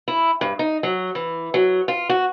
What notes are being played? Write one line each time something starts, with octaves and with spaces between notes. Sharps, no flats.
E4
G2
D#4
F#3
E3
F#3
F4
F#4